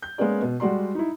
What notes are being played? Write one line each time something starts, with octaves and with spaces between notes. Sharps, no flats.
G6
G#3 A#3 B3 C#4 G#4 D5
B2
G3 G#3 F#4 D5 C6
D#4 E4